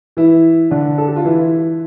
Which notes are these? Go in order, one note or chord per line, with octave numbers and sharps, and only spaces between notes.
E3 E4
D3 D4
A4
G4
F4
E3 E4